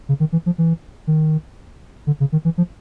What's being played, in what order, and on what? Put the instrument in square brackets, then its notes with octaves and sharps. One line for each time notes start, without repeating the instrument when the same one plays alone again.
[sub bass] C#3
D#3
E3
F3
E3
D#3
D3
C#3
D#3
E3
F3